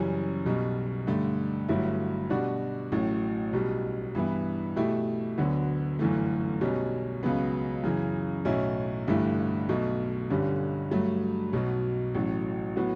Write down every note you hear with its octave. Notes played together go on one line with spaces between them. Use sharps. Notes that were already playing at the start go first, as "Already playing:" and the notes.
Already playing: F#1 F#2 E3 G3 C#4
B1 B2 G3
G2 D3 A3
G1 G2 F#3 A3 E4
B2 G3 D4 F#4
A1 A2 F#3 A3
B1 B2 G3
G2 E3 B3 E4
B2 A3 E4 G4
D2 D3 F#3 B3 F#4
G1 F#2 E3 A3
B1 B2 G3 C#4
C#2 C#3 F#3 B3
F#2 C#3 E3
B1 A2 F#3 C#4 E4
G1 G2 E3 A3 E4
B1 B2 A3
G1 G2 D3 G3 C#4
G2 F#3 A3
B1 B2 F#3
A1 A2 F#3
A2 F#3 B3 F#4